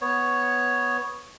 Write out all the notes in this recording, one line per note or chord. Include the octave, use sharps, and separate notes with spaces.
B3 C#5